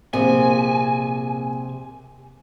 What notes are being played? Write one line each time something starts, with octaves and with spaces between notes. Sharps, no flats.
A#1 C3 G#5